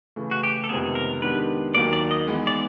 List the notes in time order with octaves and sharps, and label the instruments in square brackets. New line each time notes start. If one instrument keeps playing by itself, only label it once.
[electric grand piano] C#3 E3 A3
[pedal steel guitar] F#4
G4
A4
[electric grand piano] F2 C3 D#3 G#3 B3 [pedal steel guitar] G#4
[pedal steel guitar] A#4
[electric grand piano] D#3 G#3 B3 D4 G4 [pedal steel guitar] B4
[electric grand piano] D#2 D#3 F#3 A#3 [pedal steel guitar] D5
[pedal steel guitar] D5
D#5
[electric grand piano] E3 G#3 B3 D#4
[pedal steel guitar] D5